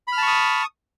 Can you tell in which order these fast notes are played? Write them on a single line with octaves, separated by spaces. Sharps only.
B5 F6 A5 C#6 D#6